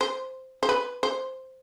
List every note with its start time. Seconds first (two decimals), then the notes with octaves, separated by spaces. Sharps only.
0.01 C5
0.63 C5
0.69 B4
1.03 C5